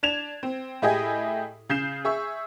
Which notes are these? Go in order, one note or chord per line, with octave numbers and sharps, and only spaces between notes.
D4 G#6 E7 F7
C4
A2 E4 G4 G#4 D#5 G#5
C#3 G6 C7 E7
G#4 E5 C#6 E6